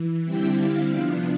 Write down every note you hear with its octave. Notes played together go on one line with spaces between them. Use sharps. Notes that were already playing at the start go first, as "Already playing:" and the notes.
Already playing: E3
D3 G3 C4 E4 G5
F5
C3 F3 B3 D4